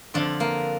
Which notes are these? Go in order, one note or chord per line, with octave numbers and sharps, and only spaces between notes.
F2 D3 F3 D4
A#3